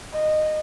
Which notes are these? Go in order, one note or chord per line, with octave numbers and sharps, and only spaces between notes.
D#5